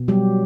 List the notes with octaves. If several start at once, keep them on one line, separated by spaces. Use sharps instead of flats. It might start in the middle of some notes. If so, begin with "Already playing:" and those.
Already playing: B2
F#3 G3 G4